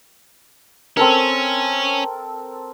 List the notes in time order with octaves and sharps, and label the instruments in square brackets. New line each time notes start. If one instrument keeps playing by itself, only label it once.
[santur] C4 A4 A#4 [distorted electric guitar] C#4